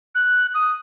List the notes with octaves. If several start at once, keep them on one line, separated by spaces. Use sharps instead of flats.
F#6
D#6